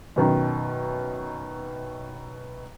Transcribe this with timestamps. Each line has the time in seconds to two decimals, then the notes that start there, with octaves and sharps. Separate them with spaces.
0.16 F#2 B2 D#3